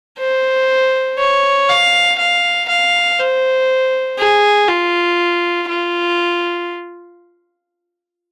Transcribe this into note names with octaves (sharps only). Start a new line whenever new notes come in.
C5
C#5
F5
F5
F5
C5
G#4
F4
F4